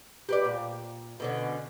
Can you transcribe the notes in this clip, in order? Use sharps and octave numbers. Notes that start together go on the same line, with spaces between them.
G4 B4 D5
A#2
B2 D3 C#4